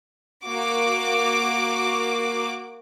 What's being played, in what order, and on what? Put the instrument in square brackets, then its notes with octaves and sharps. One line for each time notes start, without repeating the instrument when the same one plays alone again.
[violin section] A#3 F#4 D6